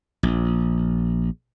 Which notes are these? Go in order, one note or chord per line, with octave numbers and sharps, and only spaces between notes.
A#1